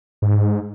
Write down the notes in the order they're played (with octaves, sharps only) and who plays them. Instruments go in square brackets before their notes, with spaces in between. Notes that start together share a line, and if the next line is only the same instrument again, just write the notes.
[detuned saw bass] G#2